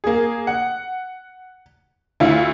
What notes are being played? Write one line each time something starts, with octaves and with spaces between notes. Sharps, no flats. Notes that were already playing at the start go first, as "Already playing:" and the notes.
A#3 G#4
F#5
D2 E4 F4